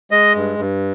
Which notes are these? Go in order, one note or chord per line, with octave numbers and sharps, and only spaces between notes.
G#3 D#5
G2
G2